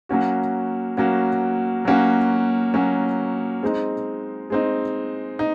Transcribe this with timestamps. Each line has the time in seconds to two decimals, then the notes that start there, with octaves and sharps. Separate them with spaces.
0.09 F#3 A#3 C#4 F#4
0.97 F#3 A#3 C#4 F#4
1.85 F#3 A#3 C#4 F#4
2.74 F#3 A#3 C#4 F#4
3.63 G#3 C4 D#4
4.50 G#3 C4 D#4
5.39 D#4